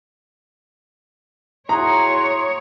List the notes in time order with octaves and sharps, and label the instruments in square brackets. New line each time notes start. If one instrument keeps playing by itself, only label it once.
[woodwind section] E4 F#4 G#4 [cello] C#5 [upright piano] A#5 [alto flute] C6